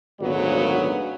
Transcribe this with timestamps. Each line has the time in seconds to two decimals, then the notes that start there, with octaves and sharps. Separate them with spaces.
0.21 G#1 D2 A#2 C#3 F#3 B3